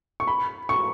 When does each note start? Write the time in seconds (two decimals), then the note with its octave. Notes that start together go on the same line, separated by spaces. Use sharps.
0.20 C#6
0.27 B5
0.69 C#6